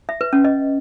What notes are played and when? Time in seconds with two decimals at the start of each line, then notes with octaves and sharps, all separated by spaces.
0.09 E5
0.21 B4
0.33 C#4
0.45 D#5